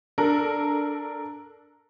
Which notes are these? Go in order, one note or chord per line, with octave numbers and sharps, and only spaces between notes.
D4 A4 A#4